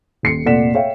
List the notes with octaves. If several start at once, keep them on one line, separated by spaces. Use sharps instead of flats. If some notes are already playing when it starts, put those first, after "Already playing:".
D#1 C7 C#7
F1 A#2 D5 F#5 B6 E7
C#5 E5 F5 G5